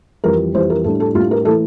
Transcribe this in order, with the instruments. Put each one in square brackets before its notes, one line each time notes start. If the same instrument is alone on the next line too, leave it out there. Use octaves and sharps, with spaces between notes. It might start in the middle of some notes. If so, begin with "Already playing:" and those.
[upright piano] F2 E3 G3 [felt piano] A#4
[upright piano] F2 E3 G3 [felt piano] C5
[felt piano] A#4
[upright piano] A2 G3 D4 [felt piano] A4
[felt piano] A4
[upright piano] A2 G3 D4 [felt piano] F4
[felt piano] A#4
[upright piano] E3 A3 E4 [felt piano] A4